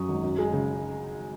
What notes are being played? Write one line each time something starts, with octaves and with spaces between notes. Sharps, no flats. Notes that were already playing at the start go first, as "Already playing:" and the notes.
Already playing: F#2 C#6 D#6
G#1
F#2
G#3
C#3